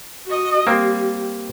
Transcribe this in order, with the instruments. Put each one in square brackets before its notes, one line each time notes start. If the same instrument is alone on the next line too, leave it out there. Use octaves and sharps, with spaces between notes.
[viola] F#4 D#5
[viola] G3 [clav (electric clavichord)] A#3 C4